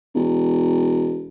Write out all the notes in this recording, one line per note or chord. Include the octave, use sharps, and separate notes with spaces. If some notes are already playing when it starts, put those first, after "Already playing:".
E1